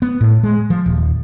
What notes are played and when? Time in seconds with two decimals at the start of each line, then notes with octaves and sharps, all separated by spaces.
0.02 B3
0.21 A2
0.43 G#3
0.70 F3
0.86 D#1